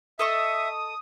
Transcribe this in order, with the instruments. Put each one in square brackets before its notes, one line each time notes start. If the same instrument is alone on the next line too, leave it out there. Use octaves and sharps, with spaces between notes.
[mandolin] A4 D#5 C#6 [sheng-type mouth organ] E5 [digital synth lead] D#6